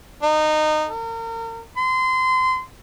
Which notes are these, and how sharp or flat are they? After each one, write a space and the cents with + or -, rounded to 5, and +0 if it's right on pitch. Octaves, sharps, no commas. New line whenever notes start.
D#4 -20
A#4 -35
C6 -25